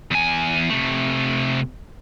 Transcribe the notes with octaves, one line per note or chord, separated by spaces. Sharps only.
E2 G#5
C3 A3